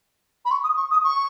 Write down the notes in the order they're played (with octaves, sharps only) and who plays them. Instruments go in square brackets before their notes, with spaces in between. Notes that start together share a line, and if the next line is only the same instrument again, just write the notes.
[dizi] B5
C#6
D#6
C#6
D#6
C#6